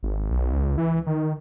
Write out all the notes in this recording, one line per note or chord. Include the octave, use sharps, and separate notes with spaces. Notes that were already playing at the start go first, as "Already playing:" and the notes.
G#1
B1
C#2
E3
D#3